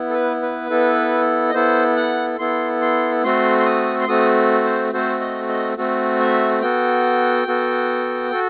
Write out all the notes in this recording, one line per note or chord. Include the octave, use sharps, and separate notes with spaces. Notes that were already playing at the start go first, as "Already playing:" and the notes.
Already playing: B3 E4
A4
B4
B4
B3 E4 A4
D#5
B3 E4 A4 C5
F#5
B3 E4 A4 C6
C6
A3 C4 F#4 A4 C6
C6
D#6
C6
A3 C4 F#4 A4 D#6
C5
A3 C4 F#4 A4 C5
D#5
D#5
A3 C4 F#4 A4
E5
B3 F#4 A4 G5
B3 F#4 A4
F#4 A4